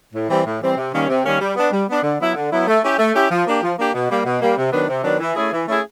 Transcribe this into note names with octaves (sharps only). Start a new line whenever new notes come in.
A2
E3 G3 C4
A2
E3 G3 C4
C3
D#3 G3 A#3 C#4
C3
D#3 G3 A#3 C#4
G3
B3 D4
G3
B3 D4
D3
F#3 B3 E4
D3
F#3 B3 E4
A3
C#4 E4 G4
A3
C#4 E4 G4
F3
A#3 D4 G4
F3
A#3 D4 G4
B2
G3 A#3
B2
G3 A#3
C3
D#3 F#3 B3 D4
C3
D#3 F#3 B3 D4
E3
A3 C#4 E4 G#4
E3
A3 C#4 E4 G#4